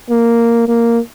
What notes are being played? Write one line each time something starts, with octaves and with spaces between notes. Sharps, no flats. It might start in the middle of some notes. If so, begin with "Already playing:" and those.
A#3
A#3